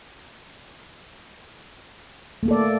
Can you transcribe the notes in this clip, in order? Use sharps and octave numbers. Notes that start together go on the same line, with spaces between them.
A3 A#3 A4 D5